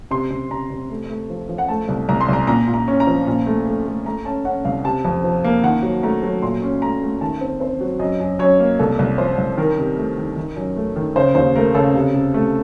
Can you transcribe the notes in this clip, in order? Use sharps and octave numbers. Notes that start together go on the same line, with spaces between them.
C3 C6
C3
C3 A#5
C3
A3
A3
F3
F3
F#5
A3 A5
C2
C2 A#5
C6
C2 A#5
A#2 A#5
A#2
A#5
C#4
A#5
F3
A#2
A3
A3
A3
A3 A#5
C#4 A5
C#4 F#5
C2 F5
C3 A5
F2
F3
A#3
D#3 F#5
F#3
A3 A#5
F#3
A#2 C6
C#4
A3 A#5
A3
D#3 A5
C4
C4 C5
F#3
F#2 D#5
F#2
F#2 C#5
A#3
C2 A4
C2
F3 C5
C2
D#3 A#4
C3
A3
D#3
D#3
F#2
A3
D#3
C#3 C5
D#2 C5
A3 A#4
C#3 A4
C3
C3
A3